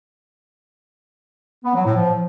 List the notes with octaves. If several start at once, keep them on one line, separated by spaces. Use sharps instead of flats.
B3
F#3
A2
F3